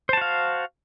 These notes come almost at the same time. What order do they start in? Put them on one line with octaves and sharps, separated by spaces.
C5 A5 F#4 F5